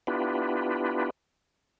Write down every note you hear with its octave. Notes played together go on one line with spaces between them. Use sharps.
B3 D4 E4 F4 G4 B4